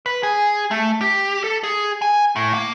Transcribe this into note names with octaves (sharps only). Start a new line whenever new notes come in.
B4
G#4
A3
G4
A4
G#4
G#5
A2
A#3